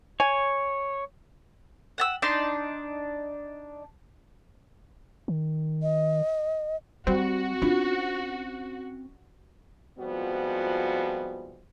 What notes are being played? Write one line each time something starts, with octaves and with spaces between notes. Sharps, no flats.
C#5 G#5
F#5 A5 E6
D4 D#4 D5 C6
D#3
D#5
G3 C4 F#4
C#4 D4 F4
F2 G#2 F3 G3 B3 F#4